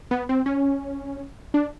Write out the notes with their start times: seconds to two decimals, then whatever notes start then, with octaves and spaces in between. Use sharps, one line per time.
0.11 B3
0.29 C4
0.46 C#4
1.54 D4